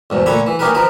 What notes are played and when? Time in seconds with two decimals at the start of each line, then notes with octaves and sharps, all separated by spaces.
0.10 E2 G#2 B2
0.26 A#2 D3 A3 C#5 F#5 B5
0.47 E3
0.59 A#3 C#4 D#4 G4 A#4 B4
0.74 D#3 F3 A#4 B4